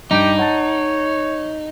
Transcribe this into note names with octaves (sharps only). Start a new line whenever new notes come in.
G2 D#4 G4 A#5 D7
C#5 F#5 A5 A6